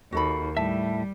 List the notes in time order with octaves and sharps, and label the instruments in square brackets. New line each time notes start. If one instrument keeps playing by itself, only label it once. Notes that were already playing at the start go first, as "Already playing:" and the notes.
[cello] D#2 [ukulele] F#4 A4 B5
[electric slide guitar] A2 E5 [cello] G3 [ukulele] A5